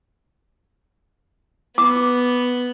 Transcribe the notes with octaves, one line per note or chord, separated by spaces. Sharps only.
B3 D6